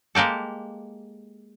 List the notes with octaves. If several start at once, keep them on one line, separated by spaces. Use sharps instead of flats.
G#3 A#3 G4 A4